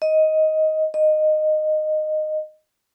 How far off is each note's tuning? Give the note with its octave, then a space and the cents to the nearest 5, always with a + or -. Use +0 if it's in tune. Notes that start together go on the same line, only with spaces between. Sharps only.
D#5 +10
D#5 -15